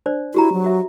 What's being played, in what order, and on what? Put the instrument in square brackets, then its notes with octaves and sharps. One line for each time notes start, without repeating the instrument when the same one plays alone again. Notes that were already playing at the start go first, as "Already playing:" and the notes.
[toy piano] D4 C5 D5
[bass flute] E4 [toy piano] F#4 G4 A#5
[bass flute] F#3
[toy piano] F#4 E5